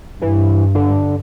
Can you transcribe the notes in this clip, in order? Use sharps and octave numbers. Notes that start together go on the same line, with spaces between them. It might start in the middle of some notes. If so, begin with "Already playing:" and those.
G2 E3
D3